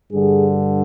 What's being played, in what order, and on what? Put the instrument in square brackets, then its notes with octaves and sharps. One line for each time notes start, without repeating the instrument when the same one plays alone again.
[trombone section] G2 D3 G#4